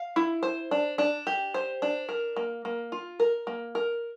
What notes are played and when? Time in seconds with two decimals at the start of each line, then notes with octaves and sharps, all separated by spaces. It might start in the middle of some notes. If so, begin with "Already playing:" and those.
Already playing: F5
0.16 E4
0.43 C5
0.71 D4
0.98 D4
1.27 G4
1.54 C5
1.82 D4
2.09 A#4
2.36 A#3
2.65 A#3
2.92 F4
3.20 A#4
3.47 A#3
3.75 A#4